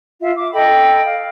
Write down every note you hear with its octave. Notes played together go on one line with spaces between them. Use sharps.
F4 E5 F5
D6
A4 D#5 G5 B5
F5